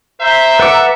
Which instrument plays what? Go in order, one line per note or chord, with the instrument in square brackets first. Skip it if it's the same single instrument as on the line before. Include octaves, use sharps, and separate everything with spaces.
[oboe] C5 [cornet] E5 [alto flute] A#5
[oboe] A4 [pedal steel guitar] B4 F#5 D6